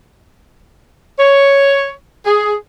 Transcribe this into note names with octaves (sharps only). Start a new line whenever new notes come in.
C#5
G#4